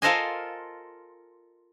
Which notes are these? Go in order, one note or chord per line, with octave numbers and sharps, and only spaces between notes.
F4 A4 A#4 C5 D#5 G#5